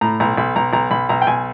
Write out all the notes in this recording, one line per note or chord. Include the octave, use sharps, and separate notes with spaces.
A2 A#5
B1 A#5
B1 B5
B1 A#5
B1 A#5
B1 B5
B1 A#5
G5
B1 G#5